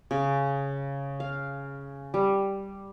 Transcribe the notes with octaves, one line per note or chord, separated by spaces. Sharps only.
C#3
F5
G3